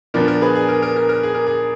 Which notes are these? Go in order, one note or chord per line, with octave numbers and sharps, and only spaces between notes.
A#2 F3 B3 D4 A#4
A#4
G#4 B4
G#4
A#4
A#4
A#4
A#4
G#4
A#4
G#4